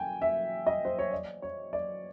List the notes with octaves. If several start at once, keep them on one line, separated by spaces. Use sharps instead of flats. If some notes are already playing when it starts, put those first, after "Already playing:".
Already playing: G5 G#5
E5
D#5
C5
C#5
D5
C#5
D5